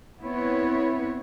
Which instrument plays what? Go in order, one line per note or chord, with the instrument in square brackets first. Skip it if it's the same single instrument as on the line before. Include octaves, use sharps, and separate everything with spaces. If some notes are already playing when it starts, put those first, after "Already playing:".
[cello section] B3 C4 E4 B4 C#5